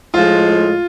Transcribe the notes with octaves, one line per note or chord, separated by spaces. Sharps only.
A2 F3 G#3 F4